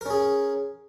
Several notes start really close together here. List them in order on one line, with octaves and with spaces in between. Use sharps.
A#4 C#4 G#4